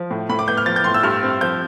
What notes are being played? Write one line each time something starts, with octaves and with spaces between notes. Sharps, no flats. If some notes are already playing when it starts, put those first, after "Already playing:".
Already playing: F3
A2
A2 B5
D6
B3 G6
F6
F3 A6
G6
A2 C6
E6
G2 F6
C4
F3 G6